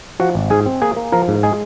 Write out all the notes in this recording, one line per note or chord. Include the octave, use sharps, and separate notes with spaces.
F3 F#4 F#5
G#1
G#2 G#4 G#5
C4
A#3 G#4 G#5
A#3
F3 A#4 A#5
G#2
G#3 G#4 G#5